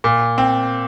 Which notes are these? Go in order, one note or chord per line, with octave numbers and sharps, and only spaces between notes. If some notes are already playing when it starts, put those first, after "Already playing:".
A#2
C4